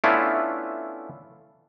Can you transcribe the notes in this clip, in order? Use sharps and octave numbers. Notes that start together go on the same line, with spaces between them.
A3 B3 C#4 D4 E4 F4